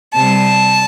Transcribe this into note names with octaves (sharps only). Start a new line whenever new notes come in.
C3 G3 A5